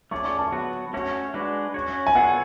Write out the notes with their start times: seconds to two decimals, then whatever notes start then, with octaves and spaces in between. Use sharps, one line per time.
0.11 A3 C#4 G#4 D5 C#6
0.25 C#6
0.39 A5
0.52 F#3 B3 F#4 B4
0.93 A3 C#4 F#4 C#5
1.34 G#3 D4 F#4 B4
1.74 C#4 F#4 C#5
2.07 G#5
2.15 B3 F4 A4 C#5 F#5